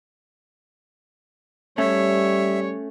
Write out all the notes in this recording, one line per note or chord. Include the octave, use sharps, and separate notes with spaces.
G3 A3 C#4 C#5 E5